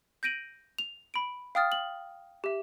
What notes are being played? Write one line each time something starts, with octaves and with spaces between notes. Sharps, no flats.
G6 A#6 D7 D#7 F#7
F7
B5 D7
F5 G5 D#6 F6 A6
F#7
G4 E5